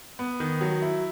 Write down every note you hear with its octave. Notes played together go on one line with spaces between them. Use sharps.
B3
D#3
F#3
E4